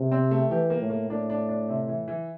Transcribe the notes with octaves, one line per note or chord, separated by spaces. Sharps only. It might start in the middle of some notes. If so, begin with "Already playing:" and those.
Already playing: C3
C4
A3
E3 G4
A#3
A2
A#3
A2 D4
D4
D4
C3
E3
E3